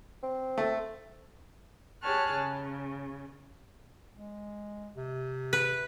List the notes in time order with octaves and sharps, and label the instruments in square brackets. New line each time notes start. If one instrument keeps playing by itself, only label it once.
[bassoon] C4
[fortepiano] A3
[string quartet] G4 G#4 C#5 A5 F6 F#6
C#3
[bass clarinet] G#3
C3
[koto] B4